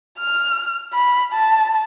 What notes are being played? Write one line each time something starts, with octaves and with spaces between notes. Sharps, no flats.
F6
B5
A5